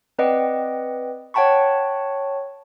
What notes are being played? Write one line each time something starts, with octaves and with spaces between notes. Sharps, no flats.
C4 B4 D5 D#5 F#5 G5
C#5 F#5 G5 A5 B5 C#6